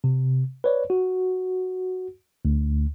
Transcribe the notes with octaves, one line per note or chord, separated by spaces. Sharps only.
C3
B4 C#5 D5
F#4
D2